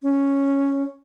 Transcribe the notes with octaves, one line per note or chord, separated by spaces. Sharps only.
C#4